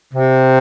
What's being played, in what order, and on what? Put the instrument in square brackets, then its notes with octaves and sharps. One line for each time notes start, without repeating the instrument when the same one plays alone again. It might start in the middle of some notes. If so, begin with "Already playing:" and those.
[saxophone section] C3